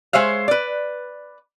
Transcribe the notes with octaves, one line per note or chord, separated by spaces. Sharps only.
G#3 C5 C#5 E5 F5
B4 D5